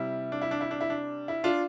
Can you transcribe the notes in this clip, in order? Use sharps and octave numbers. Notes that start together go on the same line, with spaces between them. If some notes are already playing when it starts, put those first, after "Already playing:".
Already playing: C3 G3 E4
D4
E4
D4
E4
D4
E4
D4
E4
D4 F4